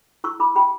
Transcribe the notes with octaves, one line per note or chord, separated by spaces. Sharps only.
E4 C#6 E6
E4 B5 D6
G4 G5 B5